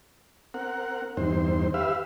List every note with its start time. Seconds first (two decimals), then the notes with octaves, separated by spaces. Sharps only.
0.54 C4 A#4 F#5
1.17 E2 G2 D#3 C4 C5
1.74 G4 B4 E5 F5